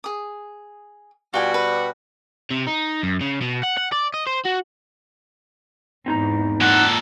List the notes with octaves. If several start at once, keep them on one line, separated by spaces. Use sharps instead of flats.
G#4 D#6
B2 G3 F4 F#4 G5 G#5
B4
C3
D#4
F#2
C#3
B2
F#5
F#5
D5
D#5
C5
F#4
E2 G#2 C4 D#4 A#5
A#2 A4 F#5